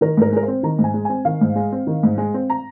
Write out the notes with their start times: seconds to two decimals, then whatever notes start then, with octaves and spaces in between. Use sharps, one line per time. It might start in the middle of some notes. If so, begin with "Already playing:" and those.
0.01 D#3 A#4
0.17 G#2 A#4
0.32 G#3 A#4
0.43 C4 C5
0.63 D#3 A#5
0.79 G#2
0.84 G#5
0.94 G#3
1.05 C4 G#5
1.25 D#3 F5
1.41 G#2
1.56 G#3
1.72 C4
1.87 D#3
2.03 G#2
2.18 G#3
2.34 C4
2.50 A#5